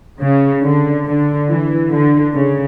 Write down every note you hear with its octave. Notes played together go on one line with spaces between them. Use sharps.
C#3
D3
D3
E3
D3
C#3